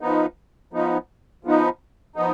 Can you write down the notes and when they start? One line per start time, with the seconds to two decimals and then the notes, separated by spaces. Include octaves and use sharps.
0.01 F3 B3 D#4
0.73 F3 B3 D#4
1.44 F3 B3 D#4
2.16 F3 B3 D#4